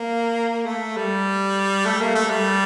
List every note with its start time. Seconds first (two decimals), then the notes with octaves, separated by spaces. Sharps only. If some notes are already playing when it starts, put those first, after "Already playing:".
Already playing: A#3
0.66 A3
0.97 G3
1.86 A3
2.01 A#3
2.15 A3
2.30 G3